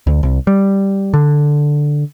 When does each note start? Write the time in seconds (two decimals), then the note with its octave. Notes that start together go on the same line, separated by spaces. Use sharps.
0.07 D2
0.23 C2
0.47 G3
1.14 D3